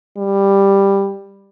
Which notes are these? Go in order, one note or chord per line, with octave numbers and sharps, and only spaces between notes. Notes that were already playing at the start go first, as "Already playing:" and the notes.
G3